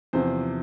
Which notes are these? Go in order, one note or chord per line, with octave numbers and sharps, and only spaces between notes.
E2 C3 F3 C5